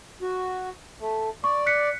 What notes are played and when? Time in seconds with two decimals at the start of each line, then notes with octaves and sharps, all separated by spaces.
0.22 F#4
1.00 A3
1.44 D5 C#6
1.66 F#6 B6 C#7